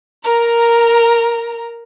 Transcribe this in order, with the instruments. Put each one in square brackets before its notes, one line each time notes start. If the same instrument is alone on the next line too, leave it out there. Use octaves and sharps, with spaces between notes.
[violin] A#4 A#5